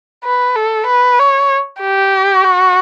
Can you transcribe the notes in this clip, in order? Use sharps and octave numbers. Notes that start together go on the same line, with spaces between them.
B4
A4
B4
C#5
G4
F#4